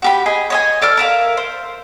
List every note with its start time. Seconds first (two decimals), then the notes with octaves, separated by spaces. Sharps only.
0.02 F#4 G4 B5
0.26 G#4 D#5 B5
0.50 C#5 D#5 G#5
0.81 A4 D5 D6 F6
0.97 A#4 E5 F5
1.37 C5